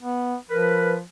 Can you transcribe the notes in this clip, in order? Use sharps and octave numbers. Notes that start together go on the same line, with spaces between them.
B3
F3 A#4 B4